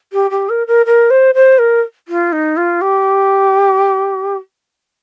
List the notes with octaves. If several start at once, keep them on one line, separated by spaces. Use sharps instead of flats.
G4
G4
A#4
A#4
A#4
C5
C5
A#4
F4
D#4
F4
G4